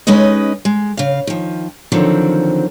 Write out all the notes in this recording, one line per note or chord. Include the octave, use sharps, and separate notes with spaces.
G#3 C#4 D#4 B4 D#5
G#3
C#3 F5
D#3 F3
D3 D#3 F3 F#3 C4